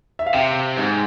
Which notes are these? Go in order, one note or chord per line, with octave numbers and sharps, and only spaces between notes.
E5
F5
C3 G5
G#2